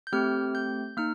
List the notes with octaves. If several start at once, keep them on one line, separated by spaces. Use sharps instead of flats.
G6
A3 C4 G4 F6
G6
A#3 D#4 F6